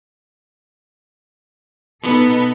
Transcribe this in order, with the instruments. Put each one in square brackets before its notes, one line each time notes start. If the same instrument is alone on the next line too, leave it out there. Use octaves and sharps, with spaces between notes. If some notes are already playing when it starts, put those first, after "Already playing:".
[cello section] B2 D#4 A4 [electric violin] B3